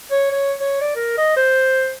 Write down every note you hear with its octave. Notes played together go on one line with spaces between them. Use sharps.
C#5
C#5
C#5
D5
A#4
D#5
C5